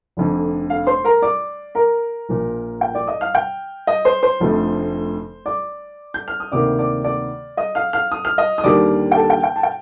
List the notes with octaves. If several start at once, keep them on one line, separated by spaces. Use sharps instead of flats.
F1 F2 D3
F5
C5 C6
A#4 A#5
D5 D6
A#4 A#5
A#1 A#2 F3
G5
D5 D6
D#5 D#6
F5 F6
G5 G6
D#5 D#6
C5 C6
C5 C6
F1 F2 D3 F3 A3
D5 D6
G6
F6
D#6
D2 C3 D#3 A#3 D5 D6
D5 D6
D5 D6
D#5 D#6
F5 F6
F5 F6
D#6
F6
D#5 D#6
D#6
D#2 D3 G3 A#3 D5 D6
G5
A4 A5
G5
G5
A5
G5